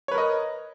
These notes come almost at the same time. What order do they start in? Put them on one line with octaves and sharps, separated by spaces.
C#5 B4 A#4 D#5